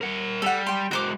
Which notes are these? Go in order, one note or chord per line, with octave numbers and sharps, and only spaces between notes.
A#4 F#5
G3 A4 F#5
G5 C6
G#3 F#4 A#4 C5 D6